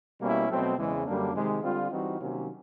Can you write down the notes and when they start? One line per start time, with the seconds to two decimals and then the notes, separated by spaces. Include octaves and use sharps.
0.20 B2 G3 A#3 C#4 E4
0.49 B2 F#3 A3 C4
0.78 E2 C#3 E3 G#3
1.05 F#2 D3 G3 A#3 D4
1.34 C3 D#3 G#3
1.63 D3 G3 C4 F4
1.91 E3 G3 C4 D#4 F#4
2.20 C3 D#3 F#3 A#3 C#4